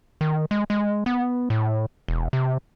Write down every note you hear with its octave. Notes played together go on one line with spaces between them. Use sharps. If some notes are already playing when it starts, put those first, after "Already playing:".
D#3
G#3
G#3
B3
A2
E1
C3